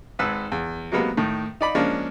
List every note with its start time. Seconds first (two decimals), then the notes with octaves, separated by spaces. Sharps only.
0.19 G#1 G#2 B4 B5 E6 F#6
0.52 E2
0.92 C3 F#3 G#3 A#3 B3
1.17 A2 D#3
1.61 D#4 D5 B5
1.75 F3 G#3 A#3 C#4 D4